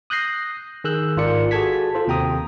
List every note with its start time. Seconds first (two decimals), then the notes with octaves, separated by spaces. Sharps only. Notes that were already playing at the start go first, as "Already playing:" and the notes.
0.10 D#6 F#6 G6 A#6 C7
0.84 D#3 G#4 E6 F#6 G6
1.16 G#1 G#2 F4 A#4 D5 C#7
1.51 F#4 G#4 A4 A5 G#6 B6
1.95 F4 A4 C5
2.07 D#2 C3 G5 A#5 D#6